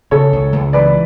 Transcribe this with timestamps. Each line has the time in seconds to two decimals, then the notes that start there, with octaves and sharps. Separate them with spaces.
0.11 C#3 A4 C#5
0.33 C#2
0.53 C#2
0.73 E3 B4 D5